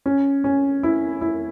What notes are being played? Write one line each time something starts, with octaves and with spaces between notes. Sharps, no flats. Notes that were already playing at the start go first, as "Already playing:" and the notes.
C#4
C#4
E4
E4